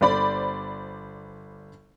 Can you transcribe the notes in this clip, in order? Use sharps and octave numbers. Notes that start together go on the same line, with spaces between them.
G1 C5 D5 B5